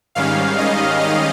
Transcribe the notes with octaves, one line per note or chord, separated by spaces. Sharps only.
G#2 D#3 G3 C#4 F5
D#5
D#5